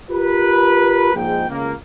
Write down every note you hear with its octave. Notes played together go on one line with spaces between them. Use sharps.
F4 G4 A#4 B4
A#1 G#2 G5
C#2 A#3